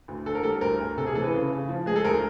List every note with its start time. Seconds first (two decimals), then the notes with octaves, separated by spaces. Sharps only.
0.08 D2
0.26 D3 A4
0.35 A#4
0.43 G3 A4
0.61 D2 A#4
0.79 D2
0.97 C3 A4
1.07 G#4
1.15 E3 A4
1.24 B4
1.33 C#3
1.51 C#3
1.69 F3
1.86 G#3 G#4
1.96 A4
2.04 D2 A#4